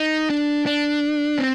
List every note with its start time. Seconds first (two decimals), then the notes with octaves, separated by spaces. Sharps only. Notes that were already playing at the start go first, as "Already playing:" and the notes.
Already playing: D#4
0.30 D4
0.66 D4
1.38 C4